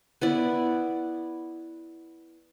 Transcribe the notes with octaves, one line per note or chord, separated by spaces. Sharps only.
B3 E4 D5